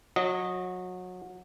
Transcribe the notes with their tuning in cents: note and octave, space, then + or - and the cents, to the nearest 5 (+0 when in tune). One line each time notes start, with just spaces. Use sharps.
F#3 -25 D#5 +0